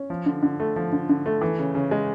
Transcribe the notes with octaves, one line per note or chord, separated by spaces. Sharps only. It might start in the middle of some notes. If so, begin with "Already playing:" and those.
Already playing: C#4
F3
D3
D3
A3
F3
D3
D3
A3
E3
C#3
C#3
G#3